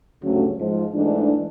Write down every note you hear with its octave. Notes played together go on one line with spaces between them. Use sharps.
D2 G2 C#3 F#3 A3 C#4
G#2 F3 G#3
G#2 E3 G#3 A3 D4